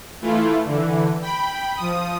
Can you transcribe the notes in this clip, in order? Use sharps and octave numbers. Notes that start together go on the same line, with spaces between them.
E3 A3 E4 F4
D3 E3
G5 B5
F3 D#6